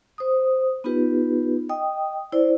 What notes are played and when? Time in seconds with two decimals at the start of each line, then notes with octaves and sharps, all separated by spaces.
0.18 C5 D#6
0.84 B3 D#4 F4 G4 B4
1.69 D#5 G5 D#6
2.32 E4 C5 D5